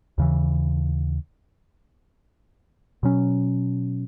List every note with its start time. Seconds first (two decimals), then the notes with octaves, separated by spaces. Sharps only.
0.18 D#2 C#3 E3
3.03 B2 F#3 C#4